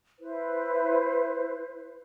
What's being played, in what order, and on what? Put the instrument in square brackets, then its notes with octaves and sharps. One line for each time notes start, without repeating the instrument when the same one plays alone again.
[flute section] E4 B4 C5